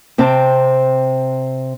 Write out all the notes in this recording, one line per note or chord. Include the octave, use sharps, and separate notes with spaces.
C3 C4 G5 A5